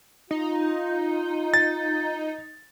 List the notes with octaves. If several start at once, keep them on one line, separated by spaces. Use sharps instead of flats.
D#4 F4
A6